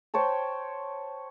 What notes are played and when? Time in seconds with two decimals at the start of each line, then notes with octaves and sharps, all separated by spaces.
0.14 C5 C#5 G5 A5